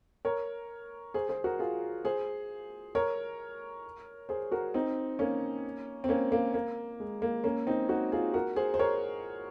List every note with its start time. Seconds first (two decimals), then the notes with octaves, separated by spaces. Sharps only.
0.25 A#4 C#5
1.14 G#4 C5
1.29 G#4 C5
1.44 F#4 A#4
1.59 F4 G#4
2.05 G#4 C5
2.95 A#4 C#5
4.29 G#4 C5
4.52 F#4 A#4
4.74 C4 D#4
5.19 A#3 C#4
6.04 C4
6.09 A#3 C#4
6.32 A#3
6.54 A#3
7.00 G#3
7.22 A#3
7.44 A#3 C#4
7.67 C4 D#4
7.89 D#4 F#4
8.12 F4 G#4
8.34 F#4 A#4
8.56 G#4 C5
8.74 C5
8.79 A#4 C#5